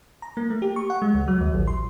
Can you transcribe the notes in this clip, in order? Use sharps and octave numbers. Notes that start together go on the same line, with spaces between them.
A#5
A#3
A3
G4
C#6
F#5
G#3
C#2
F#3
D#2
A1
C6